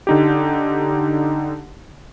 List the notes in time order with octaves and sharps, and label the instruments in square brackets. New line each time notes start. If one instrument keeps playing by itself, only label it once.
[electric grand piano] D3 D#4 G4